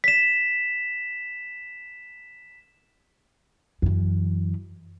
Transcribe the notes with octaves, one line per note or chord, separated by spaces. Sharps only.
B6 E7
F#2 E3